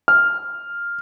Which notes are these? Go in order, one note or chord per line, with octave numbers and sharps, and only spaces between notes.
F6